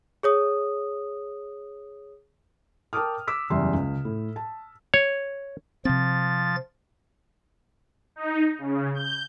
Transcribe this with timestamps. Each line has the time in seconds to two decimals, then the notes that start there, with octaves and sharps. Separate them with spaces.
0.23 G#4 C#5 D#6
2.93 A#4 G5 A5 D6 D#6 F6
3.27 D6 E6 B6
3.50 F#1 E2 C#3 G3 E5 C6
3.74 C#2
4.05 A2
4.36 A5
4.94 C#5
5.85 C3 F3 C4 A6
8.16 D#4
8.58 C#3
8.94 G6